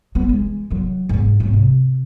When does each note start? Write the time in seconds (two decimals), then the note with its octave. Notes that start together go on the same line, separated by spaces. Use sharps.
0.15 F#3 B3
0.29 E3 G#3
0.70 D#3 F#3
1.09 G#2 A#3
1.40 G#2 F#3
1.53 C3